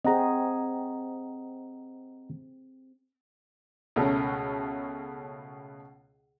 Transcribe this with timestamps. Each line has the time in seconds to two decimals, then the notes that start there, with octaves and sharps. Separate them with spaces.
0.05 C4 G#4 D#5 F#5 A#5
3.96 C#2 B2 A3 C#4 A#4